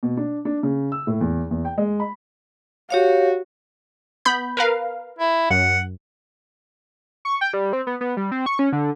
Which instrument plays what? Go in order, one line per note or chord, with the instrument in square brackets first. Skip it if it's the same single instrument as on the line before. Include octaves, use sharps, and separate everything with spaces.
[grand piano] B2
D4
D4
C#3
E6
A2
E2
E2
G5
G#3
B5
[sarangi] F#4 [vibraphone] G4 C#5 F5
[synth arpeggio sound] B3 B5 G6
A#4 B4 F5
[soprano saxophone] E4
[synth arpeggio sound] F#2 [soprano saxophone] F#5
[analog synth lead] C#6
G5
G3
C4
B3
B3
G3
C4
C#6
C#4
D3